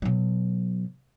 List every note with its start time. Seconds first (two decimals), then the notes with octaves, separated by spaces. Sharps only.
0.02 B2 F#3